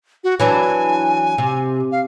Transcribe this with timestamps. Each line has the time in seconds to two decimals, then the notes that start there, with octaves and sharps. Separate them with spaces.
0.24 F#4
0.40 E3 F#3 D4 G#5
1.38 C3
1.92 F5